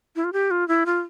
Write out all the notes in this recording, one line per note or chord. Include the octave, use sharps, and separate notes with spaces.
E4
F4
G4
F4
E4
F4